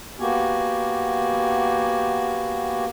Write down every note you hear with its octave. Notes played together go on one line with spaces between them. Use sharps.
A#3 B3 F#4 G4 G#5